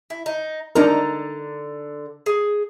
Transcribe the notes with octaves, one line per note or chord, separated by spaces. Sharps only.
E4
D#4
D3 D4 D#4 A4 A#4 A#5
G#4